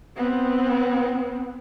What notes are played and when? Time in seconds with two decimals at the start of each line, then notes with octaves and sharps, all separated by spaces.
0.17 B3 C4